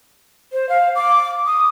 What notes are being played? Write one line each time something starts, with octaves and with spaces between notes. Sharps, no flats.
C5
F5
D6
D#6